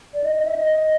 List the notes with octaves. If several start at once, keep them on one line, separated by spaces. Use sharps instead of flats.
D5
D#5
D#5
E5
D#5